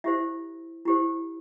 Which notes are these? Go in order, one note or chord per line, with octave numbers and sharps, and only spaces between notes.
E4 G4 C5 E5
E4 G4 C5